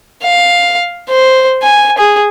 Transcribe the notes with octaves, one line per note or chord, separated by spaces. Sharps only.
F5
C5
G#5
G#4